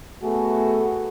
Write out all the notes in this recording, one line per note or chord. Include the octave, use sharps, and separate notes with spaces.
A3 B3 F#4 G#4 A4 B4